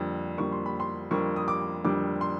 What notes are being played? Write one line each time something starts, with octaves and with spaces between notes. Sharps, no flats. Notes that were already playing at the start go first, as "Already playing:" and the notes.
Already playing: F2 D3 G3 A#3
F2 D3 G3 A#3 C#6
C6
B5
C6
F2 D3 G3 A#3 C#6
D#6
D6
F2 D3 G3 A#3 D6
C6